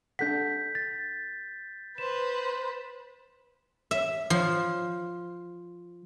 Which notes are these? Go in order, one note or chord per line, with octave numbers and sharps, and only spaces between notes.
D4 A4 F#5 G6 B6
A6
B4 C5 E7
E5
F3